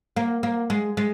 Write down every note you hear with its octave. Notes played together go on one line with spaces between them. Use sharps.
A#3
A#3
G#3
G#3